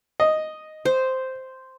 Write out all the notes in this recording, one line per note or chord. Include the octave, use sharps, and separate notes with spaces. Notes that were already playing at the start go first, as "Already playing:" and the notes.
D#5
C5